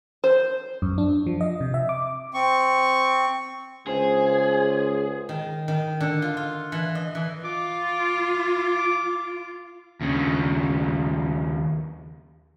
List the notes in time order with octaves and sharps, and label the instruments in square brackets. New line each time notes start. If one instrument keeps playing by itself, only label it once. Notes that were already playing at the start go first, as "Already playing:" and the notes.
[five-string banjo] C5
[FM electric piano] F#2
D4
F3
D#5
C3
E5
D6
[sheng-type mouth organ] C4 C#6
[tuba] C#2 [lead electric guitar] G#4 [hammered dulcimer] C5
[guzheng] D#3
D#3
D3
F4
F4
E3
D#5
E3
[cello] F4 [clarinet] D6
[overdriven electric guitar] D#2 C#3